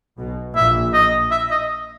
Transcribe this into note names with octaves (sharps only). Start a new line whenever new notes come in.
B1 B2
A#1 A#2 E5
D#5
E5
D#5